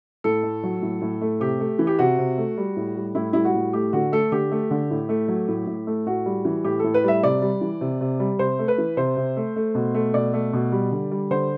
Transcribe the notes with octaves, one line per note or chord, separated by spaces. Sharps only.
A2 A4
A3
F#3
A2
A2
A3
C3 G4
A3
E3
G4
C3 F#4
C3
A3
G3
A2
G3
A2 E4
G3 E4
F#4
A2
A3 G4
D3 F#4
A3 A4
D3 G4
A3
D3
A2
A3
F#3
A2
A2
A3
A2 F#4
G3
E3
A2 G4
A2 A4
B4
G3 E5
C3 D5
G3
E3
C3
C3
G3
C3 C5
A3
B4
E3
C3 C5
C3
A3
A3
B2
A3
B2 D5
A3
B2
G3
D3
G3
D3 C5